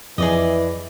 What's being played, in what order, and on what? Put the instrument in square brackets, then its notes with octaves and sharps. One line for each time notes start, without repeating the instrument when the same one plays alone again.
[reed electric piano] F2 [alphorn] E3 [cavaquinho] G#4 D5 D#5